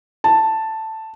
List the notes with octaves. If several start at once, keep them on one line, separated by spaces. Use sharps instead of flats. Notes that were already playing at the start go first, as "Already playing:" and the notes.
A5